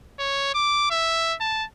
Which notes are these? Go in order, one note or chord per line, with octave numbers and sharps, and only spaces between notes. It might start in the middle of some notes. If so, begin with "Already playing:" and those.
C#5
D6
E5
A5